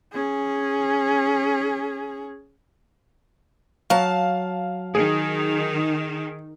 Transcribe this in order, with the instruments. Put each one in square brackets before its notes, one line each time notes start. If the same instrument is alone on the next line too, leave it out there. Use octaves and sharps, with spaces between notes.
[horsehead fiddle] C#4 G#4
[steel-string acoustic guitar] F#3 A5 [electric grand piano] F5
[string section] D#3 [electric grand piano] G#4